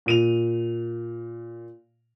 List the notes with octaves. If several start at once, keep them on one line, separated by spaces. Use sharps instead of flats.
A#2 D#7 F7